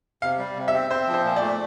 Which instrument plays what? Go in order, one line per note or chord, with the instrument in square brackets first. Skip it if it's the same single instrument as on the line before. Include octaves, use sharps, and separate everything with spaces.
[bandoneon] C3 [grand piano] F5
[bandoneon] G3
C3
[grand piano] E5
[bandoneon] C4
[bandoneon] C4 [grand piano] C5
[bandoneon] F3
[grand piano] C5
[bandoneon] A#2
[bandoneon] A3 [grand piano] D5